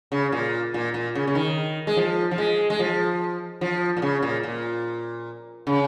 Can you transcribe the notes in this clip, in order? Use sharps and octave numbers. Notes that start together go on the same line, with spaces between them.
C#3
A#2
A#2
A#2
C#3
C#3
D#3
G#3
F3
F3
G#3
G#3
F3
F3
A#2
C#3
A#2
A#2
C#3